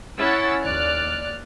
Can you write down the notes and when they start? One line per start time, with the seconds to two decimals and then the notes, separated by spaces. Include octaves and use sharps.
0.18 C#4 E4 F#5 E6 A6
0.63 D#2 D5 F6 F#6